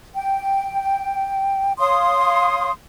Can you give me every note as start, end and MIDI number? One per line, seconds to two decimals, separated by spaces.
0.15 1.72 79
1.79 2.70 73
1.79 2.70 77
1.79 2.70 84
1.79 2.70 87